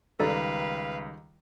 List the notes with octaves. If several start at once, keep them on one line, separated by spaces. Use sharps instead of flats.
C#2 D#3 G3 A4 B4 D5 F5 A#5